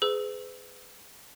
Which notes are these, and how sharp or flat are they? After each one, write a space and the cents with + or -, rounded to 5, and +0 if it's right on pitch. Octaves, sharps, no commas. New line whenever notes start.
G#4 +10 B4 +35 E6 +0